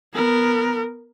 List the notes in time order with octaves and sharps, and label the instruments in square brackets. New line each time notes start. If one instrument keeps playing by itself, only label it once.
[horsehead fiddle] B3 A#4